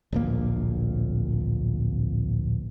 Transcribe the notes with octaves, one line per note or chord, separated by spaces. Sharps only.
D1 A#1 A#3